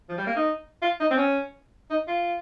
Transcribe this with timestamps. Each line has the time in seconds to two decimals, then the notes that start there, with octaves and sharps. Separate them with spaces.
0.09 F3
0.18 G3
0.27 A#3
0.36 D#4
0.82 F4
1.00 D#4
1.11 C4
1.17 C#4
1.90 D#4
2.08 F4